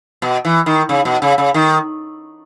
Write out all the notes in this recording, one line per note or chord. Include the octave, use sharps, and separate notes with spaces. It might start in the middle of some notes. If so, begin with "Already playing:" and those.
B2
E3
D#3
C#3
B2
C#3
C#3
D#3